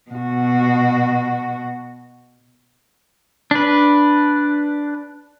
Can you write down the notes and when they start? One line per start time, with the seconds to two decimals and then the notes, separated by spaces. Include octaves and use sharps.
0.11 B2 F#4
3.51 D4 B4